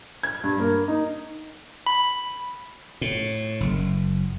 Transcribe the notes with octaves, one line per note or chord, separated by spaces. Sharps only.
G#6
G2
A#3
D#4
B5
A2
F#1